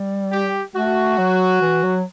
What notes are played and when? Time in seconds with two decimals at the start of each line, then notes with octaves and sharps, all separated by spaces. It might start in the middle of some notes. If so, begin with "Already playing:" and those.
Already playing: G3
0.32 G4
0.75 A3 F#4
1.18 F#3
1.62 E3
1.83 F#3